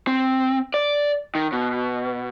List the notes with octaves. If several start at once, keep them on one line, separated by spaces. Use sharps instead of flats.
C4
D5
D#3
B2